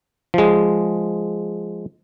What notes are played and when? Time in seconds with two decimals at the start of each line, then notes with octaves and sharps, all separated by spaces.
0.34 F3 G#3